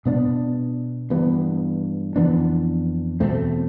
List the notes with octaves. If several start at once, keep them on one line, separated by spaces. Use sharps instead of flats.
B2 B3 D4
G2 E3 B3
F2 E3 B3 D4
E2 B2 A3 C4